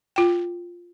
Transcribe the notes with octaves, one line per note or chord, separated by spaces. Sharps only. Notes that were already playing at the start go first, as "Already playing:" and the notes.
F4 G5